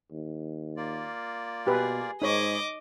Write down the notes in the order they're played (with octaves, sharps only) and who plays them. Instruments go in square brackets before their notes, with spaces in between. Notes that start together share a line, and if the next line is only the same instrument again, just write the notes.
[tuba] D#2
[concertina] A#3 F4 D5
[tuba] B2 [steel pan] G4 B4 [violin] G#4
[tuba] G#2 [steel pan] D#4 C#5 [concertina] G#4 B5 [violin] D#5 D6